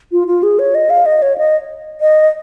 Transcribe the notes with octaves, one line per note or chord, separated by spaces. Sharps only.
F4
F4
G#4
C#5
D#5
F5
D#5
C#5
D#5
D#5